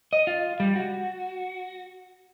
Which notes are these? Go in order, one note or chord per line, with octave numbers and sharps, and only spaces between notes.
D#5
F4
G3
F#4